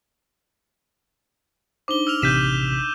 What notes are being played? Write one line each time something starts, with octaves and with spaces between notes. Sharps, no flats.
D4 D#4 C5 D6 G7
E6 F6 F7
A1 C3 G6 B6 D#7 E7